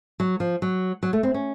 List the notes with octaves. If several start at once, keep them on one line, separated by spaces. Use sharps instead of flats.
F#3
F3
F#3
F#3
A3
C4
C#4